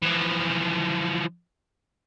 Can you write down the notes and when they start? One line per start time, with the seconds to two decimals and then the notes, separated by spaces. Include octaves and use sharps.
0.02 E3 F3